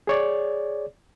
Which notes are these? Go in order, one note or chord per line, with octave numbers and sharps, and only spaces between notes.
G#4 C#5 D5